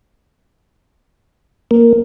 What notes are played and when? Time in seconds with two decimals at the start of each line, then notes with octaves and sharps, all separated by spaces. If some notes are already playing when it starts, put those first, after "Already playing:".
1.71 A#3